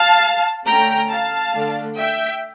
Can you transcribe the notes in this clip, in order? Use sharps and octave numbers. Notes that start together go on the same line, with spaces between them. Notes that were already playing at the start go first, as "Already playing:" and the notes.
Already playing: F5 A5
D3 A3 C#4 G5 A#5
F5 A5
D3 A3 D4
E5 G5